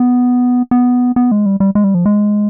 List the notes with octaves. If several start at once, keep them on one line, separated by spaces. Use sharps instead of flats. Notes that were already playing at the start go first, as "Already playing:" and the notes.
Already playing: B3
B3
B3
G#3
G3
G3
G#3
G3
F3
G#3